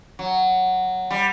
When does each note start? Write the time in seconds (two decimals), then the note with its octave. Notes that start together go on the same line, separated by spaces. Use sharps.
0.19 F#3
1.11 G3